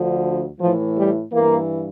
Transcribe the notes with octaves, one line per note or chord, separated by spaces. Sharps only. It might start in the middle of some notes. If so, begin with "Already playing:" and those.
Already playing: D2 D3 F3
A2 E3 F3
G3
G2 E3 A#3